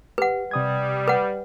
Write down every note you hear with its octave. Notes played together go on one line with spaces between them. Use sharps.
G4 B4 F#5
C3 G3 D#6 G#6
B4 F#5